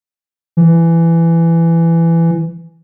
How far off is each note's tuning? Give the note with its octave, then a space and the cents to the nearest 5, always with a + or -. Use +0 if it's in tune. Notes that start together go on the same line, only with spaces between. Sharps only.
E3 +15